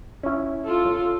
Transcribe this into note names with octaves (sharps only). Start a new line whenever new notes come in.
C#4 E4
F4 A4